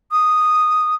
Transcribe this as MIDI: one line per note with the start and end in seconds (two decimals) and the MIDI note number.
0.12 0.95 87